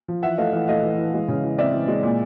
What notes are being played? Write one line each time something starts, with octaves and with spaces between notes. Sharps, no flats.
F3
E3 E5 F#5
A3 D#5 F5
E3 D#5 F5
A3 D#5 F5
E3
E3
G#3
C#3
E3
C4 D5 E5
E3
G#3
A#2